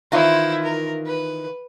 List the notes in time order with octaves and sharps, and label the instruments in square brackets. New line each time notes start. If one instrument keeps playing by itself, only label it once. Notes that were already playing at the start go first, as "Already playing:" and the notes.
[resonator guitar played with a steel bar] D#3 E3 F4 [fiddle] E4 C5
[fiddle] A#4
B4